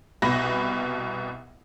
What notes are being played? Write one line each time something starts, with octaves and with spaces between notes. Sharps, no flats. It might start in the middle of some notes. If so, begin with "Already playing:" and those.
C2 B2 B5 A#6